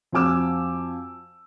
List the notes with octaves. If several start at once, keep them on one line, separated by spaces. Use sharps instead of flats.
F2 C4 F#4 G#5 D6 E6